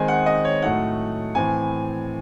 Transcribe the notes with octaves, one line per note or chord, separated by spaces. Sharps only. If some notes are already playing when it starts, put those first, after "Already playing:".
Already playing: D#3 G#3 C4 D#4 G#5
F#5
D#5
C#5
A2 F#3 A3 D#4 F#5
A2 E3 C4 G#5